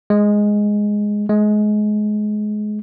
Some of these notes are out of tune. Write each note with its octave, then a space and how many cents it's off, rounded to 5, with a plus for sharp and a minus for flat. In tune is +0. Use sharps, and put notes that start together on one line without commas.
G#3 +0
G#3 +25